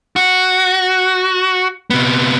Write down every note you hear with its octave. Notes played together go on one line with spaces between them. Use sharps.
F#4
C3 B3